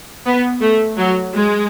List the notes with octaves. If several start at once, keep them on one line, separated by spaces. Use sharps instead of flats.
B3
A3
F#3
G#3